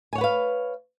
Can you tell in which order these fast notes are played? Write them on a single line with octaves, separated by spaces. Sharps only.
G#5 C#5 F#5 B4 F5